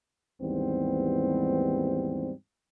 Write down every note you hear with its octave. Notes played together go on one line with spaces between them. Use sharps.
D#2 G#2 E3 G3 B3 C4